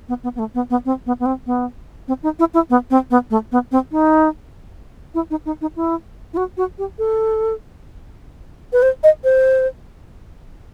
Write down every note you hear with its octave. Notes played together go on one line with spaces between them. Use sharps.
B3
B3
B3
A3
B3
B3
C4
B3
B3
C4
B3
C4
D#4
E4
E4
B3
C4
B3
A3
B3
C4
D#4
E4
D#4
D#4
D#4
E4
E4
F#4
F#4
G4
A4
B4
C5
D#5
C5